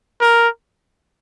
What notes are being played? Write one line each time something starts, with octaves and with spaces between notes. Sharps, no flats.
A#4